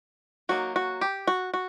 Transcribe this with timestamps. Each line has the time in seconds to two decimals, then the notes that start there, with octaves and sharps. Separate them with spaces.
0.49 F#3 A#3 D#4 F#4
0.76 F#4
1.01 G4
1.27 F#4
1.54 F#4